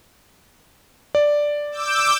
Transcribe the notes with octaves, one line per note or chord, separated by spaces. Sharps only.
D5
D6 E6 G6